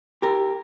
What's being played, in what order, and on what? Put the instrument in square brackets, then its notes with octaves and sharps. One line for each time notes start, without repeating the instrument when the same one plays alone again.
[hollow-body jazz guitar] G4 A#4